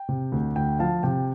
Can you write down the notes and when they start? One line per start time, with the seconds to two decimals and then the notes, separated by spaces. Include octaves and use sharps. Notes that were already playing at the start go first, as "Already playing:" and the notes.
Already playing: G5
0.09 C3
0.32 D2
0.56 D2 G5
0.79 F3 F5 A5
1.03 C3 G5